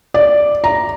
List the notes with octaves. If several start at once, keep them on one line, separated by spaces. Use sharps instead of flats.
D5
A#5